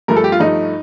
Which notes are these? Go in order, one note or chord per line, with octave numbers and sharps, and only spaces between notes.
G2 F3 A3 A#4
A4
G4
F4
G2 F3 A3 D#4